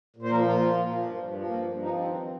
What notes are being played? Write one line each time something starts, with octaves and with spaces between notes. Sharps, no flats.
A#2
C5
F3 A#4
A#2 F4
F3
A#2
F3
G2
G2
F3
G2 A#3
G2
F3
D#4
G2 C4
D#3
D#3